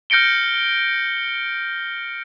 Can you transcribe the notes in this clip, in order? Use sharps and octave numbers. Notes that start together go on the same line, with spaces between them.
F6 G6 A#6 C#7 D7 G7